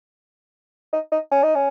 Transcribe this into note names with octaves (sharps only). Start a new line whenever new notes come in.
D#4
D#4
C#4
D#4
C#4